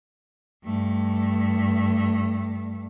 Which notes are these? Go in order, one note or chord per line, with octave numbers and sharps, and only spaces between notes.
G2 A3